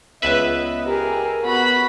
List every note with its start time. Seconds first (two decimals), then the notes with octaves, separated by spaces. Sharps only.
0.22 C#2 B3 B4 D#5 E5
0.86 G4 G#4 A#4
1.44 B3 F#4 B5